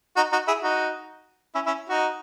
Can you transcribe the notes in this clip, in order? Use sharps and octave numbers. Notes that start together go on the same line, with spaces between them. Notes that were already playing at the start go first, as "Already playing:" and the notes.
D#4 F#4
D#4 F#4
E4 G#4
D#4 F#4
C#4 E4
C#4 E4
D#4 F#4